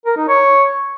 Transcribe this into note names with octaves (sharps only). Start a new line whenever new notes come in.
A#4
D#4
C#5